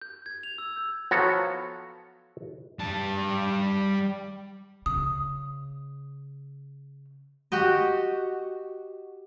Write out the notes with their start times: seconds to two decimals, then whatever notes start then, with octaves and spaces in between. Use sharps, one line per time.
0.02 G6
0.26 G#6
0.43 F7
0.58 E6
0.77 G6
1.11 F3 F#3 B3 F#4 A4 C#5
2.79 G3 A5
4.86 C#3 D#6
7.52 F#4 G4 D#5